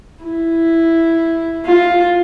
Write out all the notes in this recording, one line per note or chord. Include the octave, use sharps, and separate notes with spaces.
E4
F4